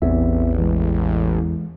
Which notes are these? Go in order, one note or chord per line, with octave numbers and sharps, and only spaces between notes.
A1 E2 B3 C4 E5
E3 G#3